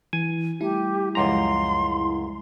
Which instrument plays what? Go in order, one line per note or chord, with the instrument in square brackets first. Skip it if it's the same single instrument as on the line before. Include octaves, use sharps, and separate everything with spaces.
[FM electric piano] E3 [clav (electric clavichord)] G#5
[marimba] G3 A3 [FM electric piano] E4 [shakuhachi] G4
[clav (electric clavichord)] C#2 F#2 A#5 [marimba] F3 G#3 [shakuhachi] C6